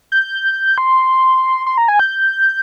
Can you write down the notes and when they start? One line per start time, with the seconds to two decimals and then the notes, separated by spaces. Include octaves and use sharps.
0.12 G6
0.78 C6
1.66 C6
1.78 A#5
1.88 G#5
1.99 G6